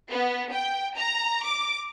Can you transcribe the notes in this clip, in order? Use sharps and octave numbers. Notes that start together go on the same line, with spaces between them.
B3
G5
A#5
D6